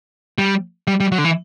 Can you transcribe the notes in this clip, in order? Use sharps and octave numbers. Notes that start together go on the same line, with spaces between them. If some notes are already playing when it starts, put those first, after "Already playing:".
G3
G3
G3
F#3
D3
E3